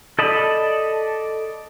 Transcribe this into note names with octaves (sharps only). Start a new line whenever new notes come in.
A4 D5 D#5 A5 B5